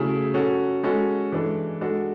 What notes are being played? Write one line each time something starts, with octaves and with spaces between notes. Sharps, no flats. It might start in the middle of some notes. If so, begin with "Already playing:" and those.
Already playing: C#3 F#3 A3 E4 G#4
F#3 C#4 F#4 A4
G#3 C#4 F#4 A4
E3 G#3 D4 A4
G#3 D4 F#4 A4